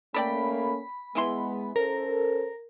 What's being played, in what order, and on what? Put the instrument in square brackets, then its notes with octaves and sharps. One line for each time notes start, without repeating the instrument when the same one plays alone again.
[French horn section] A3 A#3 C#4 [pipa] A4 D5 G5 [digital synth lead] B5
[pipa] E3 E4 C6 [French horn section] G#3 B3
[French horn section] C#4 A4 C5 [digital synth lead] A#4